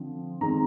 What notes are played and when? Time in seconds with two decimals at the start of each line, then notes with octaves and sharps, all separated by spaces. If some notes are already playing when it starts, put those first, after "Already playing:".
Already playing: D3 F3 C4
0.41 D#3 G#3 C4 A#5